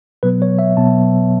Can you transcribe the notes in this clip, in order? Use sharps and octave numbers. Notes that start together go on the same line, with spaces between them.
B2 F#3 B3 B4
C#5
E5
B2 F#3 B3 A5